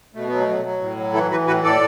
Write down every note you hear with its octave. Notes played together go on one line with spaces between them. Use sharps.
B2 A3
F#3 B3
A3
F#3
F#3
A2
F#3
E3 E4 A4
E3 F#4 B4
A2 F#4 B4
A2 A4 D5